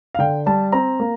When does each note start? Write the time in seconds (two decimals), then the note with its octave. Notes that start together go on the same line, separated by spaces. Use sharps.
0.15 F5
0.19 D3 G5
0.46 G3 A5
0.72 C4 A#5
1.00 A#3